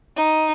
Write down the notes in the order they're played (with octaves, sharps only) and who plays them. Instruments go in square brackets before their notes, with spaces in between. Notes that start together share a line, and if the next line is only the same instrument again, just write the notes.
[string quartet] D#4